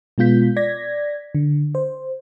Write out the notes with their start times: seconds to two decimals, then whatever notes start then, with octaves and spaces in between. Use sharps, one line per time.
0.18 B2 G#3 B3 F4 G6 B6
0.57 D5 G#6 A#6 B6
1.35 D3
1.75 C5